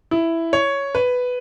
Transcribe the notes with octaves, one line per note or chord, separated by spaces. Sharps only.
E4
C#5
B4